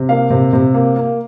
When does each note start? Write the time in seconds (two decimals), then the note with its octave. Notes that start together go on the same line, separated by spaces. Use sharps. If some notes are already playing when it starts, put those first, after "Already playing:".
Already playing: C3
0.09 A#3 F5
0.30 C3
0.53 C3
0.74 A#3
0.96 A#3